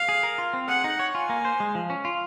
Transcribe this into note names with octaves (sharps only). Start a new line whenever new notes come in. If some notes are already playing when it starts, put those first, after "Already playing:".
Already playing: F5
G#4
A#4
F4
C4
G#4 F#5
D#4
C#5
F4 G#5
A#3
C5
G#3
F3
C#4
F4